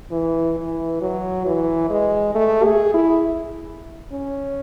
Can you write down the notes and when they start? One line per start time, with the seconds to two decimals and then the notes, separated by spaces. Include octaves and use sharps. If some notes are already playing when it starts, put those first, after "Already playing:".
0.11 E3
0.56 E3
1.01 F#3
1.45 E3
1.90 G#3
2.35 A3
2.65 G#4
2.94 E4
4.12 C#4